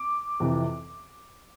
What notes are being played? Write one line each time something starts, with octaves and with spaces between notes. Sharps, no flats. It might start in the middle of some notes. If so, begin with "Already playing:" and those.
Already playing: D6
F2 C3 E3